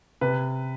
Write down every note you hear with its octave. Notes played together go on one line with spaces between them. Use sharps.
C3 B4